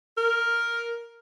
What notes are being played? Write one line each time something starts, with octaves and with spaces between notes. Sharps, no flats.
A#4